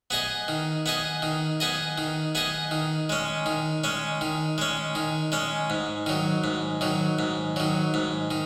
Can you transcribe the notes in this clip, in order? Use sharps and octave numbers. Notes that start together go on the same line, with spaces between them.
B3 G#4 D#5
D#3
B3 G#4 D#5
D#3
B3 G#4 D#5
D#3
B3 G#4 D#5
D#3
G#3 C#4
D#3
G#3 C#4
D#3
G#3 C#4
D#3
G#3 C#4
G#2
D#3 F#3
G#2
D#3 F#3
G#2
D#3 F#3
G#2
D#3